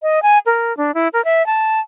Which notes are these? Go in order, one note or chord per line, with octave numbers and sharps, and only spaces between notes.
D#5
G#5
A#4
D4
E4
A#4
E5
A5